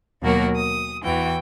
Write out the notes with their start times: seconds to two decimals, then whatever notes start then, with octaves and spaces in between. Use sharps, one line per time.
0.22 D#2 B2 F#3 A#3 F#4 A#4
0.56 D#6
1.04 E2 E3 F#4 G5